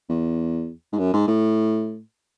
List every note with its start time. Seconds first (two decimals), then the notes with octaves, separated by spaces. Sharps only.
0.09 E2
0.93 G#2
0.98 F#2
1.13 G#2
1.28 A2